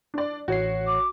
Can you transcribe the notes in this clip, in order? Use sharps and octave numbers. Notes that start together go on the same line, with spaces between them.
D4 D5
A1 F#4 C#5 C7
D6